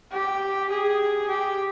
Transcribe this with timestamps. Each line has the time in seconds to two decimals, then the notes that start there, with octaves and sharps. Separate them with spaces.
0.12 G4
0.71 G#4
1.29 G4